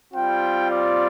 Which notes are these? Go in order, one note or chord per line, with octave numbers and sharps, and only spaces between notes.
G3 C4 F4 G5
D5